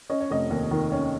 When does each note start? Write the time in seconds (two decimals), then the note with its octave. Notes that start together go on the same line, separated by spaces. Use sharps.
0.10 C#4 D#5
0.21 C#5
0.30 F1 D#5
0.50 D#2
0.71 D#3
0.92 C#4